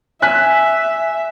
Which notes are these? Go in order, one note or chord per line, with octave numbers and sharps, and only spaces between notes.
E5 G#5 F#6 B6